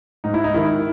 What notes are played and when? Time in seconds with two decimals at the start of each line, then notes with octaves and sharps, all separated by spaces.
0.24 G#2 D#4
0.34 E4
0.44 D#4
0.54 D#3 E4